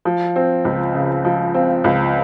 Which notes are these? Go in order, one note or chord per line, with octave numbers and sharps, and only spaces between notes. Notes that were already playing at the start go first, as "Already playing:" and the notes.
F3
C4
C#2
C#3
F3
C4
C#2